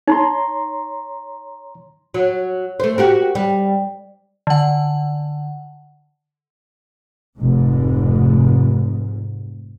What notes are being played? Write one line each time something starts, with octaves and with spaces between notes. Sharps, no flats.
D#4 C#5 A#5 C6
F#3
A3 C5
F#4 G4 A#4
G3
D3 F#5
F1 G#2